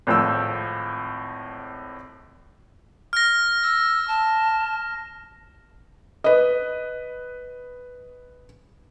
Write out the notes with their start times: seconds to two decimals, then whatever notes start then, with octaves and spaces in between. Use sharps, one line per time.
0.07 G#1 A2 F3 E6
3.13 F6 A#6
3.63 E6
4.08 A5
6.24 B4 D#5